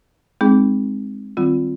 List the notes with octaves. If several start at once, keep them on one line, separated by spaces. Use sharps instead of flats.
G#3 C4 D#4 G#4
D#3 G3 C4 F4